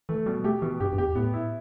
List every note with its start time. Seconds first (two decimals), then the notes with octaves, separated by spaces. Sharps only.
0.09 E3 A3
0.26 B2 G3
0.44 A3 G4
0.62 B2 E3
0.80 G2 G4
0.92 G2
0.98 E2 G4
1.15 A2 B3
1.34 E4